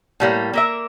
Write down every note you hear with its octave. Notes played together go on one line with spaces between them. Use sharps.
A2 G3 A#3
A#3 A#4 E5